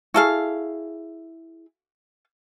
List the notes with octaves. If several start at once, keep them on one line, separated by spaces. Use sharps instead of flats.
E4 F#4 G#4 A4 F5